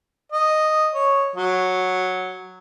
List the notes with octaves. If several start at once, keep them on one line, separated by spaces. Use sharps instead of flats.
D#5
C#5
F#3